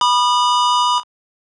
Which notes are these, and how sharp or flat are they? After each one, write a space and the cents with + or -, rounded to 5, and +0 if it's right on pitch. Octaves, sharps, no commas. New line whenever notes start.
B5 -10 D#6 -40